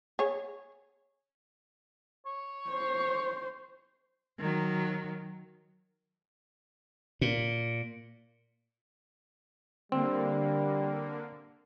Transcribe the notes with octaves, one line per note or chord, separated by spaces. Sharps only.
G#4 C#5
C#5
C5
D#3 F#3
A#2
D3 G3 A#3 C4